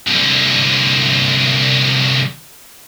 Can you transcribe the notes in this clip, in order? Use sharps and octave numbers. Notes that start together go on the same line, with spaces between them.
C2 D3